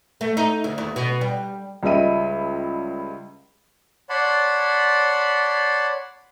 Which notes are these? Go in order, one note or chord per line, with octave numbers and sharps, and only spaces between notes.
A3
D#4
D2
D#2
B2
G3
C#2 G3 D#5 E5 D#7
C#5 D5 F#5 A5 B5 C6